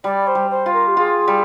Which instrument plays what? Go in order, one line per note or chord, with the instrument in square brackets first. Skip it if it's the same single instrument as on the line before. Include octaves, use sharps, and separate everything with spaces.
[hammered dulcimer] G3 [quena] D5
[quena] C5
[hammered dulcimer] G3
[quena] C5
[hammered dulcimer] F4
[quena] A#4
G4
[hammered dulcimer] F4 [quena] G#4
[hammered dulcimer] G3